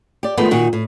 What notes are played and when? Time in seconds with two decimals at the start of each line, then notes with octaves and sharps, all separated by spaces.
0.23 G4 D5
0.37 D#3 F3 G#3 A3 B3
0.51 A#2 D#3 F#4
0.73 A2